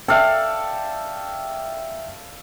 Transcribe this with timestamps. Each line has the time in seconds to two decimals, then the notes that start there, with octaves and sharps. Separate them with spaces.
0.08 A4 D5 E5 F5 G5